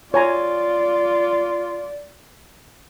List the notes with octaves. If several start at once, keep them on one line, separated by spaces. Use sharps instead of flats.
F4 C#5 D5 G#5 A#5